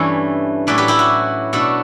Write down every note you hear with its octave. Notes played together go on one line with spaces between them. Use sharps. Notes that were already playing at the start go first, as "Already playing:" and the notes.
Already playing: G2 E3 A3 C#4 C#5 E5
A2 F#3 C#4 E4 B4 D5
G4 B4
E4 G4
F#4
B2 A3 D4 F#4 A4